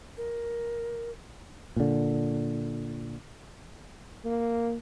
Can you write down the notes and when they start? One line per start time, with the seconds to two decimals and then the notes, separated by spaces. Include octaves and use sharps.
0.17 A#4
1.76 A#2 D3
4.24 A#3